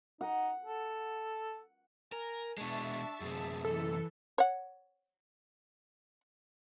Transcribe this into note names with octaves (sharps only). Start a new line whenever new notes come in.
D#4 F#5
A4
A#4 G#5
B2 G#3 D4 E5 A5 C#6
F#2 C3 G#4
E3 A4
C#5 F#5